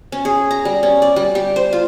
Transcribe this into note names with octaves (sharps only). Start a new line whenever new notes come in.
C#4
G#4
A#5
G3
C#4
D5
G3
G4
C5
F4